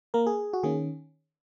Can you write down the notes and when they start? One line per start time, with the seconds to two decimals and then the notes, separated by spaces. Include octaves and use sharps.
0.14 A#3 A#4
0.26 G#4
0.53 F#4
0.63 D#3 A#3 C#4 G#4